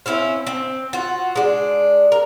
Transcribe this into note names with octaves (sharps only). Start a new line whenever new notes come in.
C4 C#4 E4 F5
C4
F4 F#4
G#3 D4
A#4